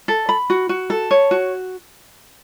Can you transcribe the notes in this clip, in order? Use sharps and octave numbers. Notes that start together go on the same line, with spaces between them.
A4
B5
F#4
F#4
A4
C#5
F#4